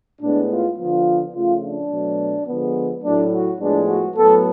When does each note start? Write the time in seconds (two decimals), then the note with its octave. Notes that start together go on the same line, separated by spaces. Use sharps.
0.20 A2 G#3 B3 D4
0.49 F4
0.78 D3 F3 B3 F4
1.33 C#3 F3 A3 F4
1.62 D4
1.90 B2 F#3 A3
2.47 D3 F3 G#3 B3
3.03 A2 F#3 A3 D4
3.31 F#4
3.59 A2 F3 G#3 B3 D4
3.88 F#4
4.15 A2 F#3 B3 A4